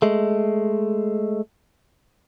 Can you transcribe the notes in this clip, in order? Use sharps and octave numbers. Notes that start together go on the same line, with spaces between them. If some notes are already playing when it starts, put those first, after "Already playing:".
G#3 A3